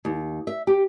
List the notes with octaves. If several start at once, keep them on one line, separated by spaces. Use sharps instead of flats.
D#2
E5
G4